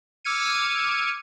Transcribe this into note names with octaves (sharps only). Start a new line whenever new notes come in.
D6 E6 F6 G#6 C#7 D#7